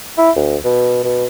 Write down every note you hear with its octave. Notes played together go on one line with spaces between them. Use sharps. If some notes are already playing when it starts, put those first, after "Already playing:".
E4
D2
B2
B2